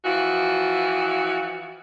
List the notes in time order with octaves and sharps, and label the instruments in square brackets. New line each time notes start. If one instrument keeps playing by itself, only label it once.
[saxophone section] E3 F3 F#4